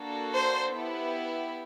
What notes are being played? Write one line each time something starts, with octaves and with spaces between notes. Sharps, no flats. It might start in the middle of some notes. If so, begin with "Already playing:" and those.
Already playing: A#3 D4 F#4 A4
C5
B3 E4 G4